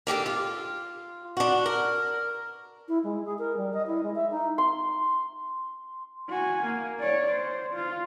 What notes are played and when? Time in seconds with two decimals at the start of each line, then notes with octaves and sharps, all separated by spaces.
0.07 A#3 D4 G4 A4
0.26 F4
1.37 D4 F#4
1.66 A#4
2.88 E4
3.04 G#3
3.25 G#4
3.39 A#4
3.57 G3
3.74 D#5
3.87 E4
4.03 G#3
4.15 E5
4.31 D#4
4.58 C6
6.29 F#4 G#5
6.64 A#3
6.99 C#5 D5
7.31 C5
7.74 F4